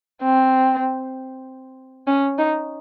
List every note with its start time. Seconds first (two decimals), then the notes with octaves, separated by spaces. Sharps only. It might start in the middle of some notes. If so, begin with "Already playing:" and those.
0.23 C4
2.07 C#4
2.38 D#4